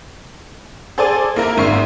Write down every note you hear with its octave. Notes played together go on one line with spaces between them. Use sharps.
G#4 A4 C5 D5 G#5 D6
A#3 E4 A#4
G#1 G#2 E5 C#6 C7